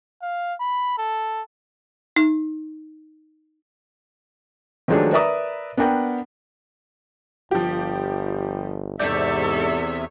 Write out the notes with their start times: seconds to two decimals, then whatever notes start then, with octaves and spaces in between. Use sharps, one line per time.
0.22 F5
0.60 B5
0.98 A4
2.16 D#4
4.88 D#3 F3 F#3 G#3 A3 D4
5.12 A#4 B4 D5 E5 A#5 D#6
5.77 B3 D4 A#4 F#5 G5
7.51 G1 F3 G4
8.99 E2 G#2 C3 A4 C#5 D5 E5 G6